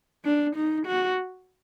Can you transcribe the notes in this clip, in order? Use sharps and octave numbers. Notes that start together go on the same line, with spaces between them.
D4
D#4
F#4